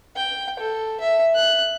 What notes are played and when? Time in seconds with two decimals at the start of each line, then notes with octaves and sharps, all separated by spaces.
0.16 G5
0.59 A4
1.00 E5
1.36 F#6